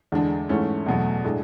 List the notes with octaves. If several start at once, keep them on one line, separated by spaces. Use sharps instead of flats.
E2 D3 G#3 D4
G#2 E3 A3 C#4
E2 B2 F#3 A3
A2 G#3 D4